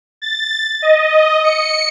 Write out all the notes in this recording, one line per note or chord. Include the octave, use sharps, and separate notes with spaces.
A6
D#5
C#7